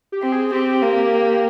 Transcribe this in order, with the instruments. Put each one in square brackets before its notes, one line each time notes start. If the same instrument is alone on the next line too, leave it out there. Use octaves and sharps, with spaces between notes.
[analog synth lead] G4
[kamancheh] C4
[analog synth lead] G#4
[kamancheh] C4 [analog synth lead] G4
[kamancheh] A#3